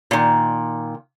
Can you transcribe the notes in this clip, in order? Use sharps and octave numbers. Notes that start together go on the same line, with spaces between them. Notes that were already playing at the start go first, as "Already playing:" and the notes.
A#2 D#3